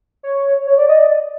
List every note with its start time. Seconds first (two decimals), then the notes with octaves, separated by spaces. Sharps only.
0.23 C#5
0.67 C#5
0.78 D5
0.89 D#5
0.99 D5